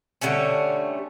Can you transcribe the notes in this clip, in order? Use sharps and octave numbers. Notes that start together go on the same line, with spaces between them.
D3 G3 A3 C#4